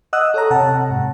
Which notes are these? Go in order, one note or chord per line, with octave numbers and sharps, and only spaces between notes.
D#5 F#5 D#6 E6 F#6
A4 C#5 A#5
C3 F#5 A5 A#5
G#2